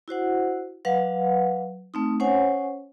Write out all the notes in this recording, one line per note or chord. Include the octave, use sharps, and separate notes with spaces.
E4 F#4 C5 F#5
F#3 B4 F5 F#5
A3 C4 D#4
C#4 C5 C#5 F#5 G#5